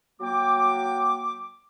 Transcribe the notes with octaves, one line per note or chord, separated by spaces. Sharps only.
F#3 A#3 G5 D6